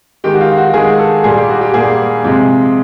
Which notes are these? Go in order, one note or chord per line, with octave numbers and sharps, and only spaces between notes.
D#3 G#3 G4
F#4
F4
F#4
D#3 G#3 G#4
A4
A#2 G3 A#3 G#4
G4
F#4
G4
A#2 G3 A#3 G#4
C3 F3 G#3